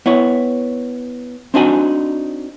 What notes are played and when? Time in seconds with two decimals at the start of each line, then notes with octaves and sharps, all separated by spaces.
0.06 B3 E4 C#5
1.54 C4 D4 D#4 F#4 G#5